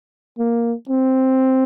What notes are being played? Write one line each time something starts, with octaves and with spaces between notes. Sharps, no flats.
A#3
C4